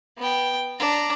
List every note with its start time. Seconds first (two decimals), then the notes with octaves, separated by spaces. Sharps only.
0.18 B3 G5
0.79 D4 A#5